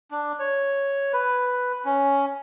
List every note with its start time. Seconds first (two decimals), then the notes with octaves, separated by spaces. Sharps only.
0.11 D4
0.40 C#5
1.13 B4
1.85 C#4